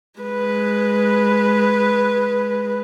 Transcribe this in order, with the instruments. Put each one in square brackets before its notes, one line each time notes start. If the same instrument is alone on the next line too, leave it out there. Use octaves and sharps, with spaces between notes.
[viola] G#3 B4